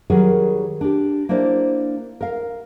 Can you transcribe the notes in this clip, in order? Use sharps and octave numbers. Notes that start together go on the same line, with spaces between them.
D#3 F#3 G3 G#4 A#4
D4 G4
A#3 D4 E4 C5 D5
A#4 F5